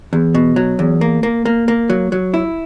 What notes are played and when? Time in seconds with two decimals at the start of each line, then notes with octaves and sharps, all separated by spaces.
0.13 E2
0.34 B2
0.56 F#3
0.79 E2
1.01 A#3
1.23 A#3
1.45 A#3
1.68 A#3
1.90 F#3
2.12 F#3
2.34 E4